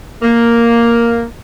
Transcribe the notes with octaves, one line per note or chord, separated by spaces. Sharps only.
A#3